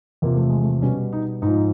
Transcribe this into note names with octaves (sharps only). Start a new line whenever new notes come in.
E2 C3 F3 A#3
A3
G#3
A3
B2 G3 C#4
D#4
G#2 F3 D#4